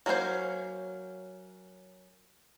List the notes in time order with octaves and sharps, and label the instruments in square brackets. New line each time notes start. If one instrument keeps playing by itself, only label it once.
[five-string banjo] F#3 A#3 C#4 F#4 C5